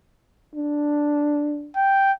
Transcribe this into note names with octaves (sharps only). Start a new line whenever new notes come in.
D4
G5